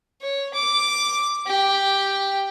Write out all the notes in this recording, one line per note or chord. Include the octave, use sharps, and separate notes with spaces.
C#5
D6
G4